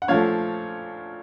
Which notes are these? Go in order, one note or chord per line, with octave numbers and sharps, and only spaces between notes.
F#5
A#2 F3 A3 C#5 F5